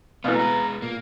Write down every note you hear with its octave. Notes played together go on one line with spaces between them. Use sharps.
B2 E3 A3 B3 F5
G#3 B4 A#5
A#2 A#3